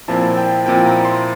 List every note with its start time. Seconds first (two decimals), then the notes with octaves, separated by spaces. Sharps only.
0.08 A#2 F3 C4 E4 A5
0.37 G5
0.66 A#2 F3 C4 E4 G5
0.86 A#5
1.05 C6